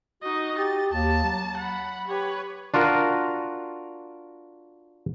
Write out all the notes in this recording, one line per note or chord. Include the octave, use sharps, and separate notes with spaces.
D#4 F#4 D#5
G4 A6
D#2 A5
F#3
F#5 B5
G4 B4 C#5
D4 F4 F#4 A#4